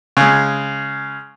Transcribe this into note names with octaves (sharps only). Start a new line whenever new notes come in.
C#3 G#3